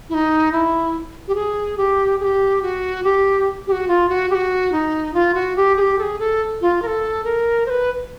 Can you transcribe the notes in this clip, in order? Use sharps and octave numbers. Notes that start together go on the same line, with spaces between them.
E4
D#4
E4
G4
G#4
G4
G#4
G4
F#4
G4
G4
F#4
F4
F#4
G4
F#4
D#4
F4
F#4
G4
G#4
G4
A4
G#4
A4
F4
A#4
A4
A#4
C5
B4